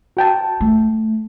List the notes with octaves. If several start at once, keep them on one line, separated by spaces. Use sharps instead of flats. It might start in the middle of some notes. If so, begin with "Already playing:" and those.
F#4 G5 A5
A3